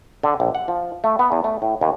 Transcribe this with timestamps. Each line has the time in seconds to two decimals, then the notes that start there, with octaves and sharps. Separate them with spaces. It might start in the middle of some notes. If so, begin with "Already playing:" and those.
0.23 D3
0.40 A#1
0.55 F#5
0.68 F3
1.04 A3
1.19 B3
1.32 E2
1.44 A3
1.62 A2
1.81 D#2